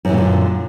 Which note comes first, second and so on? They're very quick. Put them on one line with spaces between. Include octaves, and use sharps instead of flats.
F#2 E3 A#2 D3